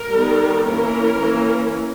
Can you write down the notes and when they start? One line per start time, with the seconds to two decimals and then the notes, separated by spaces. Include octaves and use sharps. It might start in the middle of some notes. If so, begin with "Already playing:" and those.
Already playing: A#4
0.13 D#3 G3 B3
0.66 E3 A#3 C#4 A#4
1.19 E3 A#3 C#4